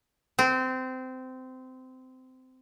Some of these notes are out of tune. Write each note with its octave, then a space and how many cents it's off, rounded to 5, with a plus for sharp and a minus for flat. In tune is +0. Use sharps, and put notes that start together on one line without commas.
C4 -20